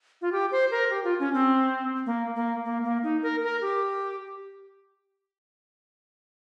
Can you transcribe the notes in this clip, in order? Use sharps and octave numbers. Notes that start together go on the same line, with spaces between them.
F4
G4
C5
A#4
G4
F4
C#4
C4
A#3
A#3
A#3
A#3
D#4
A#4
A#4
G4